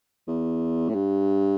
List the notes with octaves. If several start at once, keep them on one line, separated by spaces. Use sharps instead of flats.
E2
A2
G2